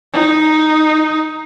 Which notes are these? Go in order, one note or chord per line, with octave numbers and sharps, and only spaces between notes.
D#4